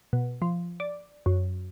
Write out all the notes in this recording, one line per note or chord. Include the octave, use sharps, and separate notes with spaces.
B2
F3
D5
F#2